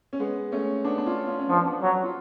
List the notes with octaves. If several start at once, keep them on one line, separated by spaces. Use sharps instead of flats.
C#4
G#3 B3
A3 C#4
B3 D4
D4
C#4 F4
C#4 F4
C#4
F3 B3 D4
B3 D4
F#3
F4